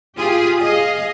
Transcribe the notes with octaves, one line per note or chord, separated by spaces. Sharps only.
F4 G4 G#4
G#4 D#5 F5